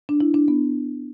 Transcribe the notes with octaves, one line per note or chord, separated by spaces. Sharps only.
D4
E4
D4
B3